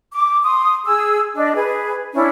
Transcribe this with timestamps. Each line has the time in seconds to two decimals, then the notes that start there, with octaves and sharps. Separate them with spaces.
0.13 D6
0.44 C6 D#6
0.86 G#4 E6
1.36 D4 D#5
1.55 G#4 B4
2.14 C#4 D4 E4